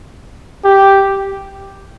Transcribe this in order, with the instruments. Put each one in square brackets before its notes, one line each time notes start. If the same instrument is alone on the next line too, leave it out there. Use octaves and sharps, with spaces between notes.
[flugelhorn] G4